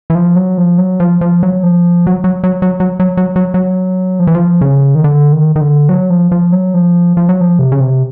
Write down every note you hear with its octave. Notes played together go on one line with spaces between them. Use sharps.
E3
F3
F#3
F3
F#3
F3
F3
F#3
F3
F#3
F#3
F#3
F#3
F#3
F#3
F#3
F#3
F#3
F3
E3
F3
C#3
D#3
D3
D#3
D#3
D3
F#3
F3
F3
F#3
F3
F3
F#3
F3
C3
C#3
C3